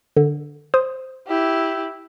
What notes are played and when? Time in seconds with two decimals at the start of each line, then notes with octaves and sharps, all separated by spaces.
0.17 D3
0.74 C5 D#6
1.27 E4 G4